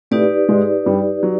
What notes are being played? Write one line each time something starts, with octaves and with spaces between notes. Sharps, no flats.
A2 A3 D#4 G4 B4 D5
G#2 G#3
G2 G3
F#3